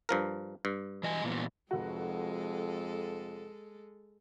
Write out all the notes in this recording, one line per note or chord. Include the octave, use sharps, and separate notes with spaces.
G2 F3 A#4
G2
E3 D#5 G#5
A#2 E3 B3
F1 F2 G#3 F#4 A4